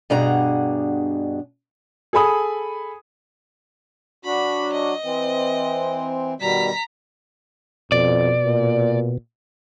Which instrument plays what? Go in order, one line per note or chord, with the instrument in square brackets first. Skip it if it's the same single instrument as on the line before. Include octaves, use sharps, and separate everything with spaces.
[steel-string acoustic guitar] G2 B2 D4 G#4 F#5 A#5
[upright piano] G#4 A4 G#5 B5 D#6
[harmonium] F#3 D4 F#4 [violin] B5
[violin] D#5
[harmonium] E3 C4
[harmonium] B2 D#3 G3 [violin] A#5 B6
[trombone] F2 [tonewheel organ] B2 [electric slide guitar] D5
[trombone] A#2